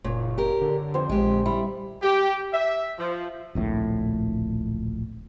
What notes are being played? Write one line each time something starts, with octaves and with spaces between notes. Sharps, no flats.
F#1 A#2 C#5
G4 A#4
D3
F2 C4 C5 G5
A#1 G#3 G4
G3 E4
G4
E5
F3
D1 A#1 A2 A3